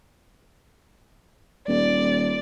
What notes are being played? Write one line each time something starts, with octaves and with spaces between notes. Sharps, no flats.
D#1 D5